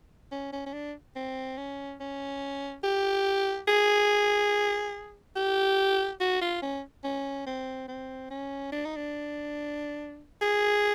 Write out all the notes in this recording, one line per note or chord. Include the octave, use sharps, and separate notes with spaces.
C#4
C#4
C#4
D4
C4
C#4
C#4
G4
G#4
G4
F#4
F4
C#4
C#4
C4
C4
C#4
D4
D#4
D4
G#4